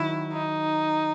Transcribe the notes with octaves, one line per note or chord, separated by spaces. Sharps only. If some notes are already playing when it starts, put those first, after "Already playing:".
Already playing: D#3 F#3 E4 F#4
D#4